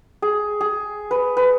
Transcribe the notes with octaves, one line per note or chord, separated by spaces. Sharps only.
G#4
G#4
B4
B4